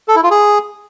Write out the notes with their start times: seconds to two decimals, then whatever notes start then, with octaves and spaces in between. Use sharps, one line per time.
0.08 A4
0.16 E4
0.23 F4
0.31 G#4